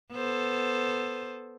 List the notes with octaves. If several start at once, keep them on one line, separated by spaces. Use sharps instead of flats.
B3 A4 C5